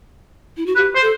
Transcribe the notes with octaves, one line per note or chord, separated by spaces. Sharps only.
E4
F#4
G4 B4
C5
A4